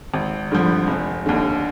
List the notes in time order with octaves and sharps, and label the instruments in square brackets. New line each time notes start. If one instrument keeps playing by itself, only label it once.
[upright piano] G#1
G2 D3 F3
F1
D#2 D3